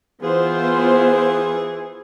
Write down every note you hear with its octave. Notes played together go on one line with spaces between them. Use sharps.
E3 B3 F4 G#4 C5